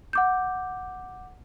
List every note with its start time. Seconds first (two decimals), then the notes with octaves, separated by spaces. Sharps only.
0.13 F#5 D6 G6